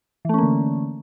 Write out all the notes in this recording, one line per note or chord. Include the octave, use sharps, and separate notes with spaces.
D3 E3 A3 A#3 C#4